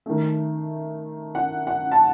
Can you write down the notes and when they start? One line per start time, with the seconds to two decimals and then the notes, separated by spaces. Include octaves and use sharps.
0.06 D#3 A3
1.35 F#5
1.67 F#5
1.92 A5